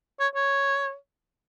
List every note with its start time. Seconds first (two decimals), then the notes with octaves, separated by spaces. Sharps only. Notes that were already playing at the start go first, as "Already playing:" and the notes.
0.20 C#5
0.35 C#5